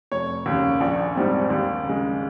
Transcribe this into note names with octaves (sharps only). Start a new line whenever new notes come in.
F1 C#5
D#2 C#3
A#1
G#2 G3 C4
D#2
C#3 G#3